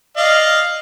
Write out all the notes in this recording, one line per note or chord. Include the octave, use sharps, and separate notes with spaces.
D5 D#5 F5